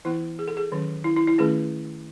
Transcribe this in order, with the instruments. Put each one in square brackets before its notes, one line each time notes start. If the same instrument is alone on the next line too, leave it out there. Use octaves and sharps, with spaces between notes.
[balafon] E3 B3 E4
G#4
A4
G#4
D#3 F#3 C#4
E4
E4
E4
D#3 A3 C#4 G#4